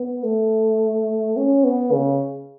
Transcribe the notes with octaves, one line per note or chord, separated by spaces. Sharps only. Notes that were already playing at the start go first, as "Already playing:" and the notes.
Already playing: B3
A3
C#4
B3
C#3